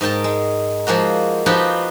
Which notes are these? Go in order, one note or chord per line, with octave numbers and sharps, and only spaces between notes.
G#2 A#4 G5 A5
G#3
F3 G#3 A#3 F#4
F3 B3 D#4 F#4 G4 B4